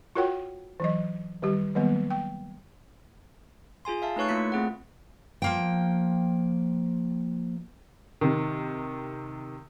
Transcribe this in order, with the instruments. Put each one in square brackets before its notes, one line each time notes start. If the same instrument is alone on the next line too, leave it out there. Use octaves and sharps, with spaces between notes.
[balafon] F4 F#4 A#4 C#5 F#5 G5
E3 F#3 D#5
D#3 G3 G4
D#3 F#3 G3 A#3 B3
G5
[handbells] F4 G#4 G#5 C6
E5 F5 A5
A3 D#4 B4 C#5 C#6 F#6
A3 A#3 E4 F4 B6 C#7
A3 C4 G#4 F#5
[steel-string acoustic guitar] F3 A#3 G5
[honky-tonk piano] C3 D#3